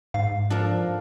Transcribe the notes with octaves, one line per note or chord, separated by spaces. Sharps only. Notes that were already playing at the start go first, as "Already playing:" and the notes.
G#2 F5
F3 D4 A4 A#4